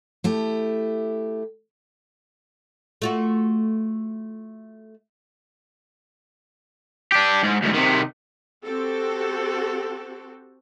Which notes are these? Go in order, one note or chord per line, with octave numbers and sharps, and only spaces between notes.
A3 E4 G4
A3 F4 F#4
D4 G4
G#2
D2 G#2
C3 D#3
C4 F#4 G4 A4